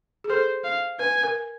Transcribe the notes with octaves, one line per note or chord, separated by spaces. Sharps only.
G#4
A4 C5
F5
B4 G#5
A#4